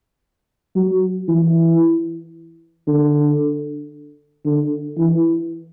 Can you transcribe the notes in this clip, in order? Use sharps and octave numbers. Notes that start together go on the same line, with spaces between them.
F#3
E3
D3
D3
E3